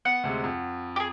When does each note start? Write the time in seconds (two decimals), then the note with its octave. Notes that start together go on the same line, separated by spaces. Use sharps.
0.05 B3 F#5
0.24 D2 C3 G#3
0.44 F2
0.96 G4 G#4